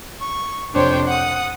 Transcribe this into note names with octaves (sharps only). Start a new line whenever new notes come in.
C#6
F2 C3 D4 C5 C#5 G5
F#5 D#6